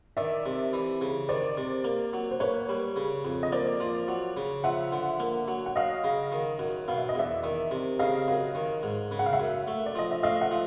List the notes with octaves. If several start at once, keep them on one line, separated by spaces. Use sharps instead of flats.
D#3 D5 E5
C3
E3
C#3
D#3 C5 D5
C3
A#3
F#3
C5
A#3 B4 C#5
G3
C#3
F2
D#5
A#3 C5 D5
F3
F#3
C#3
F3 E5 F#5
D3
A#3
F#3
F#5
F#3 D#5 F5
C#3
D#3
F#2
B2 F5
E5
D#5
E2 D5 E5
D#3
C3
C#3 D#5 F5
F#2
D#3
G#2
C#3
F#5
F5
E5 F#5
F#2
A3
D5
F3 D#5
E5
A3 D#5 F5
E5 F#5
F3